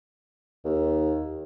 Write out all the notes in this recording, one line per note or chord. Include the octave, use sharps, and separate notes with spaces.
D#2